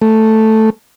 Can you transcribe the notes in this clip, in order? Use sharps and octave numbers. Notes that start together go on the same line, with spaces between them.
A3